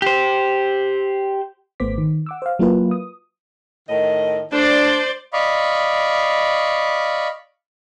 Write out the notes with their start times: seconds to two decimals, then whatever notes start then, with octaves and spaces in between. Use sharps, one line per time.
0.02 G4 C5
1.80 G#1 A3 B3 C5 D6 B6
1.98 D#3
2.26 F#5 D6 E6
2.42 C5 F5
2.59 F#3 A#3 E4 F4 B4
2.91 D#6
3.89 A2 D#3 D#5
4.52 A3 D4 C5 D5
5.33 D5 D#5 F5 B5 C#6